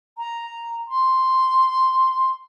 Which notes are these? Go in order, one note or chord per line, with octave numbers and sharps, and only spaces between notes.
A#5
C6